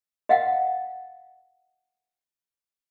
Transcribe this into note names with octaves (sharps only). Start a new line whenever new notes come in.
D#5 F5 F#5